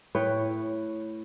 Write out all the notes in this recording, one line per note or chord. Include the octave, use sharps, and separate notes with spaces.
A2 B4 C#5 G5